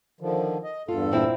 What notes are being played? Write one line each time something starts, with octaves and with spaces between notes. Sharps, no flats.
D3 D#3 F3
D#5
E2 G2 F4 A4
A#2 C4 E4